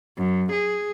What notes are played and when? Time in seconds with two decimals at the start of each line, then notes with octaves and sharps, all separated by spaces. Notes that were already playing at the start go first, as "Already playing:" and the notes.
0.17 F#2
0.52 G#4